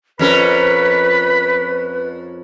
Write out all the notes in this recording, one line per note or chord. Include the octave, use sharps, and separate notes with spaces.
F2 C#4 A#4 B4 B5